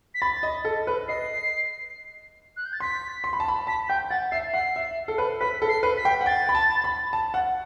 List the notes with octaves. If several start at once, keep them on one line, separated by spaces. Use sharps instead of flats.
B6
B5 A6
D#5
A4
B4
D#5 C7
F#6
G6
A6
C6 B6
C6
B5
A5
B5
A5 B6
G5 G6
F#5 A6
E5 C7
F#5 C7
E5
A4
B4
B4 B6
A4
C7
B4
B6
G5
F#5
G5 A6
B5
A5
B5
A5
F#5